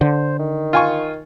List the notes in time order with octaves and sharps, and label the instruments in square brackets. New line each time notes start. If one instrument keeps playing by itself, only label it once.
[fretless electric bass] D3 [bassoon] C5
[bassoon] D#3
[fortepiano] F4 G#5 C#6